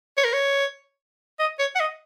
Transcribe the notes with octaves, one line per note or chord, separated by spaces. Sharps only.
C#5
A#4
C#5
D#5
C#5
F#5
D#5